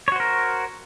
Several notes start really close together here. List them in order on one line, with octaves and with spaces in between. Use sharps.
C#5 F#4 C5 A#4